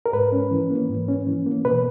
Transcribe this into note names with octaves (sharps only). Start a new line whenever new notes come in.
A#4
G#2 B4
C#4
E3
A#3
G#2
C#4
E3
A#3
B2 B4